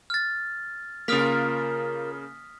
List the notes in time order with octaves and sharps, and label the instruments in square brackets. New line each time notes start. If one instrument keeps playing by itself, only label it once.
[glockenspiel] F6 A6
[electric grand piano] C#3 A#3 [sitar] F4 A#4 [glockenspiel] D#6 F6 B6